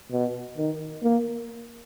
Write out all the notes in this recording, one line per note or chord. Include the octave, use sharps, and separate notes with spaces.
B2
D#3
A#3